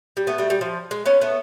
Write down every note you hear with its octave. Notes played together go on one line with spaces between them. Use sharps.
G3
A3 B3
G3 A3
G3
F3
G#3
B3 C#4
A3 B3